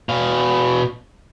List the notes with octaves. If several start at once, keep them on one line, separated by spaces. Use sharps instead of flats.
B2 F5